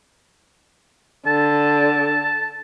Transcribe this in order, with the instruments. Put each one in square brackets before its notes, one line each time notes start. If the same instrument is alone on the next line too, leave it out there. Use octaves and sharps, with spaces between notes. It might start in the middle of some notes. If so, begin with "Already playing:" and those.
[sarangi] D3 [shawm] A5